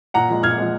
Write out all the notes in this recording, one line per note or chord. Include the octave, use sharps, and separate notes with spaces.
A#2 F#5 A#5
F3 G#3
A#2 F6 G#6
F3 G#3